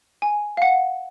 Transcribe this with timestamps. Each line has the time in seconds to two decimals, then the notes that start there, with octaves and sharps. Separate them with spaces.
0.22 G#5
0.57 F5
0.62 F#5